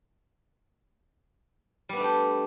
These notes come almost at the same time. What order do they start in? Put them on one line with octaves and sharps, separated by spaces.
G3 B3 D4 A3 G4